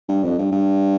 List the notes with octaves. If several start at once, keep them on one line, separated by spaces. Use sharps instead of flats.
G2
F2
G2
G2